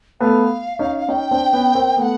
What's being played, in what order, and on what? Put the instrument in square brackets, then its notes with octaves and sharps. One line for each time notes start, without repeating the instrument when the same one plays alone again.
[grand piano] A3 B3 [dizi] F5
[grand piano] C#4 D#4
[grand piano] C#4 D#4 [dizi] G5
[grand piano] C4 D4
B3 C#4
A#3 C4
[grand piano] A3 B3 [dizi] F#5 G5